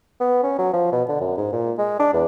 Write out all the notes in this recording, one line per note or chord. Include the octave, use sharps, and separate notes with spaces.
B3
C#4
F#3
F3
B2
D3
F#2
G#2
A#2
G#3
D4
E2